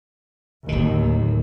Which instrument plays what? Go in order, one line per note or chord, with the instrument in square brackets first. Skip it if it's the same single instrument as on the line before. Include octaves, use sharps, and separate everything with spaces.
[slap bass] D1 D#3 [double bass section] D#2